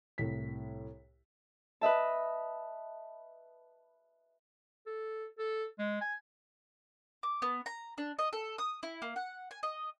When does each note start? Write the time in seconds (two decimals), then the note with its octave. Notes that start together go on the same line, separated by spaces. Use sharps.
0.18 C2 A2 B6
1.81 B4 D#5 E5 A5
4.86 A4
5.38 A4
5.79 G#3
6.01 G#5
7.23 D6
7.42 B3
7.66 A#5
7.98 D4
8.19 D#5
8.33 A4
8.58 D#6
8.83 E4
9.02 A#3
9.16 F#5
9.51 G#5
9.63 D#5